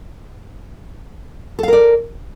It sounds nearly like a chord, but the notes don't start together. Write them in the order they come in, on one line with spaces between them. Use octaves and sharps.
A4 F5 A#4 D5